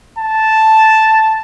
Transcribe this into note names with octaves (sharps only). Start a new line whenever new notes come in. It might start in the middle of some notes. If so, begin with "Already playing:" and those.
A5